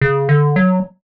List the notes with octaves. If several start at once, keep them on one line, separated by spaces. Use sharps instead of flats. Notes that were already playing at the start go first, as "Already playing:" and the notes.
C#3
D3
F#3